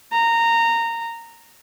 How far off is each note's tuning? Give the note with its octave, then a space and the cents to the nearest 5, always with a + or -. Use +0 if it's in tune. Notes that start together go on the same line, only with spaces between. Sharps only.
A#5 -15